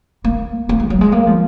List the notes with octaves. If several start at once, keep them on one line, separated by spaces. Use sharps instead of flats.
A#3
A#3
G#3
F#3
G#3
A#3
F3